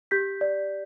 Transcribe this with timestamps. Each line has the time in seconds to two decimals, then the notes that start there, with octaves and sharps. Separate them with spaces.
0.11 G4 G6 B6
0.41 D5